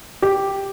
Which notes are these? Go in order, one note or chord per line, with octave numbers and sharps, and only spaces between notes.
G4